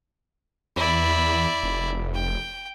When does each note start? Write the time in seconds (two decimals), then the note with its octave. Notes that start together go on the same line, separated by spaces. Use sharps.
0.76 E2 E4 D5
1.63 F1
2.14 G5